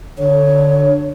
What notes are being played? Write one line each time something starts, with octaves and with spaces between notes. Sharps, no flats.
D3 C#5